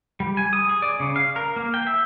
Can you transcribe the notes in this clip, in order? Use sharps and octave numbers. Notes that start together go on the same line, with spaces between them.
G3
G#5
D#6
G#4
D5
C#3
F5
A#4
A#3
G5
E5